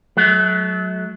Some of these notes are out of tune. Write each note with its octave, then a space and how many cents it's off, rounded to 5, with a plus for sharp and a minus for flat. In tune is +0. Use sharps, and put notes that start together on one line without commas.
F#3 +0 A3 -40